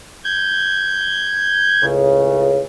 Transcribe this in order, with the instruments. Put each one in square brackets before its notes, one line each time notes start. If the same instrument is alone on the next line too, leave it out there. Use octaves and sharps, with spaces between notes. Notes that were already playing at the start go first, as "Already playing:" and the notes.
[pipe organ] G6 G#6
[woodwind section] C#2 A2 C#3